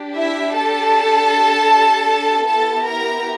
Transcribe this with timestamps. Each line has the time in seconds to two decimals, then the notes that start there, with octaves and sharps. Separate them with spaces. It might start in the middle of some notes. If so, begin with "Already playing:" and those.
Already playing: D4 G4
0.17 E4 E5
0.55 A4 A5
2.48 B3 E4 G4 A4 A5
2.86 A#4 A#5